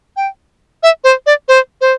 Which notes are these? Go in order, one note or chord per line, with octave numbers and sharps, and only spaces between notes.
G5
E5
C5
D5
C5
C5